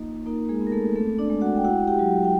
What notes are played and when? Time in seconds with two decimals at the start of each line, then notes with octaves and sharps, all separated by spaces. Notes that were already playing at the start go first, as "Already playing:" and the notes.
Already playing: A#3 D#4 F4 D#5
0.26 A#3 D#4 A#4
0.49 G#3 G#4
0.61 B3
0.67 A#4
0.72 A3 A4
0.95 A3 C4 A4
1.19 D4 D5
1.30 G#3
1.41 F#4 F#5
1.57 G5
1.64 E4 F#4 F#5
1.88 G4 G5
1.99 F#3
2.24 G5